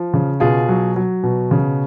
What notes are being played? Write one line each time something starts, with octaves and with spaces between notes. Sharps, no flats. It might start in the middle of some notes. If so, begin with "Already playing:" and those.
Already playing: F3
C#3
B2 F4 G#4
F#3
F#3
B2
C#3